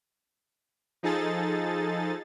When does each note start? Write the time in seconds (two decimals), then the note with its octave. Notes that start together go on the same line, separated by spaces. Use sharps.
1.03 F3 D#4 G#4 A4 A6